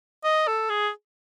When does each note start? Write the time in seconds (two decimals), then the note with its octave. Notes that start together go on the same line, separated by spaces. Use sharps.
0.24 D#5
0.47 A4
0.70 G#4